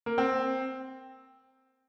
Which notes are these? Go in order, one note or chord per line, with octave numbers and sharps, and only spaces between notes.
A#3
C4